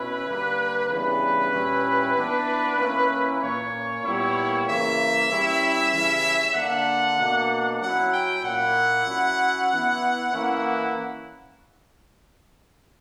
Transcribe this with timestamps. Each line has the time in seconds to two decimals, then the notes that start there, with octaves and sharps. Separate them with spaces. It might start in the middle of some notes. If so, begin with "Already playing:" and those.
Already playing: B2 C#4 E4 B4
0.26 D3 G3 A#3
0.89 C#3 E3 G3 B3 D4 B4
1.52 A#2 G3 C#4 E4
2.15 E3 B3 D4
2.78 E3 A#3 C#4 E4
3.41 A#2 A#3 C#4 C#5
4.04 A#2 G3 B3 E4
4.67 C#3 E3 A#3 E5
5.29 E3 G3 C#4 E4
5.93 C#3 E3 G3 C#4 E4
6.55 D3 A#3 D4 F#5
7.18 B2 A#3 D4
7.81 F#3 C#4 E4 F#5
8.13 G5
8.44 A#2 A#3 E4 F#5
9.07 F#3 C#4 E4
9.70 E3 B3 E4
10.33 E3 A#3 C#4 E4